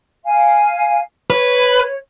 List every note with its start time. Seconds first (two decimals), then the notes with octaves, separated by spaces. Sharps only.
0.24 F5 G#5
1.30 B4 C#5